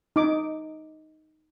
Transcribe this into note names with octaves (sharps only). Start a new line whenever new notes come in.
D#4 D6